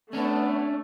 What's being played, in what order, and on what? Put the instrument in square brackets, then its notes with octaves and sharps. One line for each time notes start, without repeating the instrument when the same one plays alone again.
[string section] A3 [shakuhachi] B3 [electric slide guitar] C#4 D4